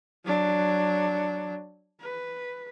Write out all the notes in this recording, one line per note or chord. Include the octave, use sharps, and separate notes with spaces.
F#3 D4
B4